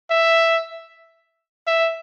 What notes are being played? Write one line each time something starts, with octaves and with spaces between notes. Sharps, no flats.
E5
E5